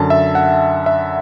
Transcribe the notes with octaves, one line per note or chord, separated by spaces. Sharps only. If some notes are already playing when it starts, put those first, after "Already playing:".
Already playing: F#2 D3 A5
E5
F#5
E5